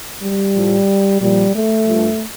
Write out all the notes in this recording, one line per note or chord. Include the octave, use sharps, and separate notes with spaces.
G3
A2 F3
A#2 F3 G3
A3
G2 F3